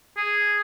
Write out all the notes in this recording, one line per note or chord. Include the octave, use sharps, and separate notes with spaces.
G#4